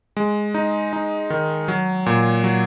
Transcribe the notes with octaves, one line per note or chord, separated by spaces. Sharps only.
G#3
D#4
D#4
D#3
F#3
A#2
F#3